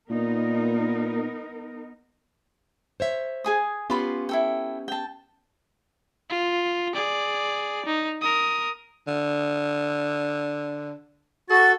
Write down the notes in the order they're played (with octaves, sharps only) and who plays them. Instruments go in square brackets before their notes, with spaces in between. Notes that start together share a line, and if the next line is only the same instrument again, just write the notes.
[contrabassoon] A#2 [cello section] B3 D#4 A#4
[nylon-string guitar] C5 C#5 E5
[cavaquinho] G#4 G#5 D#6
[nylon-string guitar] B3 C#4 G4 [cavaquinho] F4 B5 C6
[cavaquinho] E4 A4 G5
G5 A5
[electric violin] F4
G#4 D5
D#4
A#4 D#6
[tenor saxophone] D3
[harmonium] F#4 [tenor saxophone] A4 [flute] A6